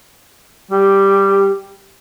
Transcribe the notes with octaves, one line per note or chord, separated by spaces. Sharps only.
G3 G4